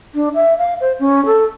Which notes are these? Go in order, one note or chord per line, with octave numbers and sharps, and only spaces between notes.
D4
E5
F5
C5
C#4
A4